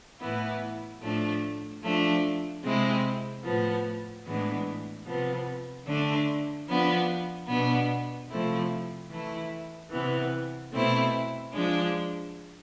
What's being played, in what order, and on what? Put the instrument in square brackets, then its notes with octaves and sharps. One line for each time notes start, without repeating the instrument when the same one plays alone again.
[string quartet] A2 E3 B3 E4
A2 F3 A3 D4
F3 A3 D4
C3 G#3 C4 E4
A2 F3 B3
A2 E3 G#3 B3 D4
C3 F3 B3
D3 A3 D4
F3 B3 D4
B2 B3 D4
C3 F3 A3 C4 E4
E3 A3 E4
C3 E3 B3
B2 A3 C4 E4
F3 G#3 D4